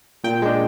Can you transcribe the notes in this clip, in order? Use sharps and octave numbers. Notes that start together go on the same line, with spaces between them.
A#2 G5
G#3 D4